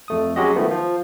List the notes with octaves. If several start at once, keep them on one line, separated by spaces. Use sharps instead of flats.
F2 A3 D#6
F#3 G#3 C#4 F#4 G4 D#5
D#3 F3 A3 B3
F3